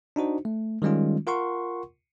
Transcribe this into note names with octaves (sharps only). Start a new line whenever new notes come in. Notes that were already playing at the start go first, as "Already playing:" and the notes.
D4 D#4 F#4 C5
A3
D#3 G3 G#3 C#4 F4
F4 A#4 F#5 C6 C#6